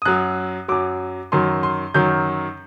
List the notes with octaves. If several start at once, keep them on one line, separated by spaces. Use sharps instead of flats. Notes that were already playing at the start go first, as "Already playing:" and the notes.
D#6
F#2 F#3 F#6
F#2 F#3 D6
F#2 D#3 F#3 C6
C6
F#2 D#3 F#3 G6